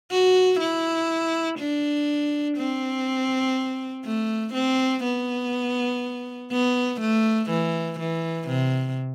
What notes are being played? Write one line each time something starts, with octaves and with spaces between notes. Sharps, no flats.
F#4
E4
D4
C4
A3
C4
B3
B3
A3
E3
E3
C3